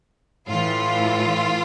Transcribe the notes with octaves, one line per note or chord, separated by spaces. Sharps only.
A2 E3 F4